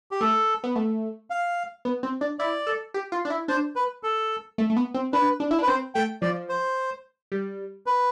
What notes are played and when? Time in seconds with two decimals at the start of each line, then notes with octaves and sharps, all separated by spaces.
0.11 G4
0.21 A3 A4
0.64 B3
0.76 A3
1.30 F5
1.85 B3
2.03 C4
2.21 D4
2.39 E4 D5
2.67 A4
2.94 G4
3.12 F4
3.25 D4
3.30 E4
3.48 D4 C5
3.76 B4
4.03 A4
4.58 A3
4.70 A3
4.76 B3
4.94 C4
5.13 D4 B4
5.40 D4
5.51 E4
5.59 D4 B4
5.67 C4 C5
5.95 A3 G5
6.22 F3 D5
6.49 C5
7.32 G3
7.86 B4